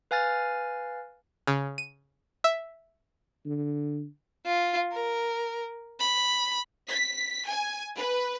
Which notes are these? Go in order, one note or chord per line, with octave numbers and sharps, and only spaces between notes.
B4 F5 G#5 F6 A6
C#3
D#7
E5
D3
F4
A#4
B5
B6
G#5
B4